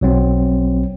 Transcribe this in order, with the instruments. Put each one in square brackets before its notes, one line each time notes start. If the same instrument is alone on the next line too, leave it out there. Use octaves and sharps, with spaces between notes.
[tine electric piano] B1 F#3 C4